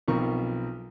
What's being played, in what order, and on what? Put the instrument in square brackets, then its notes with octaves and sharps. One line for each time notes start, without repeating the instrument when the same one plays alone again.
[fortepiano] B1 B2 F3 C4 A#4 C#6